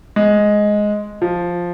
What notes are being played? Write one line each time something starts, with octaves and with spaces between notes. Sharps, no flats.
G#3
F3